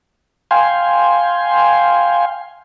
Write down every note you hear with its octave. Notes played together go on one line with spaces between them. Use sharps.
F5 G5 G#5 C6